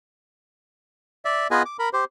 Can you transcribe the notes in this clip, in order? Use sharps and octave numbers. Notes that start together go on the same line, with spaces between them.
D5 E5
B3 F4 G#4 B4 D#5 G#5
D6
A#4 B5
G4 C5